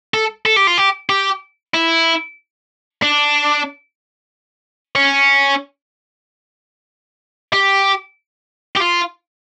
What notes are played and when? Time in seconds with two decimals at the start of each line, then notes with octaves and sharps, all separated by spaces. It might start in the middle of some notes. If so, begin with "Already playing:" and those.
0.14 A4
0.46 A4
0.56 G4
0.67 F4
0.78 G4
1.10 G4
1.74 E4
3.03 D4
4.95 C#4
7.53 G4
8.77 G4
8.81 F4